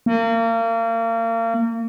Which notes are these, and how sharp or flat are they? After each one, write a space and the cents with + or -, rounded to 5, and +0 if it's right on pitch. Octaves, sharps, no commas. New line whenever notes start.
A#3 -35